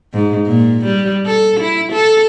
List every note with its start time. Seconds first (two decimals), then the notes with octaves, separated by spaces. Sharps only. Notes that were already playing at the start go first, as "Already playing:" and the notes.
0.13 G#2
0.47 A#2
0.85 G3
1.25 A4
1.60 E4
1.92 A4